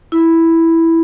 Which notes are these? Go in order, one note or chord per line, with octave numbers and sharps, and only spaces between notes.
E4